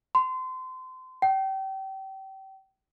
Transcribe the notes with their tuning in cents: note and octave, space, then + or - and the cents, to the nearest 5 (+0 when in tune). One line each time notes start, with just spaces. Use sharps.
C6 -30
G5 -30